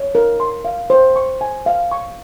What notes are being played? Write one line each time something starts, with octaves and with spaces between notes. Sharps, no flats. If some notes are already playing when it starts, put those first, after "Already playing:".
Already playing: C#5
A#4
C6
F5
C5
C#6
G#5
F5
C#6